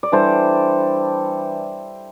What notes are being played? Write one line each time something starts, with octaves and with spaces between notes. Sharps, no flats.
D5
E3 G3 D4 A4 C5